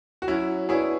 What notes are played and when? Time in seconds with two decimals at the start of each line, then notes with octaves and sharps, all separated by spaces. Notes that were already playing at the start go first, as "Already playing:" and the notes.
0.22 F#4
0.28 F#3 C#4 E4
0.69 B3 D4 E4 F#4 G#4 C#5